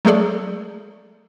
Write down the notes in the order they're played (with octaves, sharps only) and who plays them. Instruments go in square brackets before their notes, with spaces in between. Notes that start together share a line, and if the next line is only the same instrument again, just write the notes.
[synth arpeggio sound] F#3 G#3 A3 G#4 A4 D5